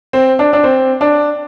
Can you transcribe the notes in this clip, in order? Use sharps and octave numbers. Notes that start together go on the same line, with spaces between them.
C4
D4
D4
C4
D4